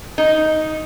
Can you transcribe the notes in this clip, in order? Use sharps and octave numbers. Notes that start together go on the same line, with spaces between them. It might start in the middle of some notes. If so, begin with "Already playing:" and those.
D#4